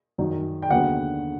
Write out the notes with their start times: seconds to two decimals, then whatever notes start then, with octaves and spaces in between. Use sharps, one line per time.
0.18 F#2 D#3 F#3
0.62 G5
0.70 D#2 D3 F#3 B3 F#5